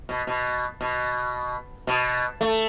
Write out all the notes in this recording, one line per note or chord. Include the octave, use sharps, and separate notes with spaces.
B2
B2
B2
B2
A3